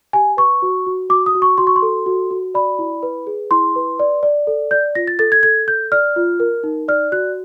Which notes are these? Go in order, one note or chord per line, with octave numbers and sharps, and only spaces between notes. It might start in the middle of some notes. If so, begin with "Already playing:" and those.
G4 G#5
B4 C#6
F#4
F#4
F#4 D6
D#6
F#4
C#6
F#4 C6
C#6
C6
A4
F#4
F#4
D5 B5
E4
B4
G#4
E4 C6
B4
D5
D5
A4
D5 G6
F4 A#6
A6
A4 A6
G#6
A4 G#6
A4 G6
D5 F6
F4
A#4
D#4
D5 F6
F#4 F#6